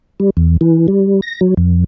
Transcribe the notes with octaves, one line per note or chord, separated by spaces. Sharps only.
G3
E2
E3
G3
A#6
F#3
F2